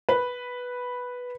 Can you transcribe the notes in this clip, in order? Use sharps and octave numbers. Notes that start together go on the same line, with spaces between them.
B4